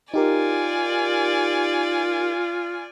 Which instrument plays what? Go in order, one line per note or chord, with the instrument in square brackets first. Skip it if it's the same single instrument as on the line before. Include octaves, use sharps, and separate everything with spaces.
[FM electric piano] D#4 G4 A#4 [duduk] F4 [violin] D5 G#5